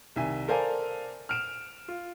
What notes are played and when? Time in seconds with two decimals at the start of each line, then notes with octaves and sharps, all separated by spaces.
0.16 C2 D#3 E5 G#5
0.48 A4 A#4 C5 D5 F5 G#5
1.29 F6 D7 E7
1.88 F4